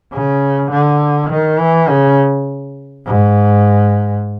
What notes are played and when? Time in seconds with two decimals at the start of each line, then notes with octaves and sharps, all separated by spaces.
0.13 C#3
0.71 D3
1.30 D#3
1.60 E3
1.89 C#3
3.06 G#2